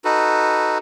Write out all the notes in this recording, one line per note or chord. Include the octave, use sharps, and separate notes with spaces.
D#4 F#4 A4 B4